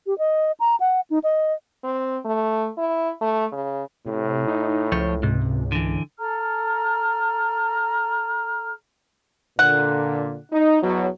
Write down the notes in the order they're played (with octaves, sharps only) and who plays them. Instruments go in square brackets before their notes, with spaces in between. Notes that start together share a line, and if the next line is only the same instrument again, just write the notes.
[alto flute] G4
D#5
A#5
F#5
D#4
D#5
[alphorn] C4
A3
E4
A3
C#3
[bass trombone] A2 [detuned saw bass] C3
[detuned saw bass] D#4
[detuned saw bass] C#2 [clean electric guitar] F3 C5 C#5
[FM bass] G#2 [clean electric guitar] C3
[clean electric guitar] D3 E3
[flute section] A4 A#5 F6
[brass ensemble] A#2 D3 [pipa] F#5
[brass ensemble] D#4
E2 B2 F#3